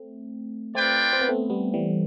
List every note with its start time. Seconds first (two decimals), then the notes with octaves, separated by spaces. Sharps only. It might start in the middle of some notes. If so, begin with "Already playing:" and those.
Already playing: A3 C4
0.75 A3 C4 F4 B4 D5 G5
1.13 C4
1.21 B3
1.29 A3 C4
1.50 G3 B3
1.74 E3 G3